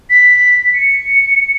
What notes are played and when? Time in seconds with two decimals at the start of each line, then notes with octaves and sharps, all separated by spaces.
0.10 B6
0.75 C#7